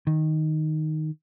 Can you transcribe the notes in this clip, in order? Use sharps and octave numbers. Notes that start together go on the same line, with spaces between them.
D#3